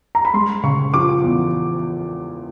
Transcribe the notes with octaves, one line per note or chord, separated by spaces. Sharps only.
A#5
B5
G#3 C6
C#3 C#6
F3 D6
E2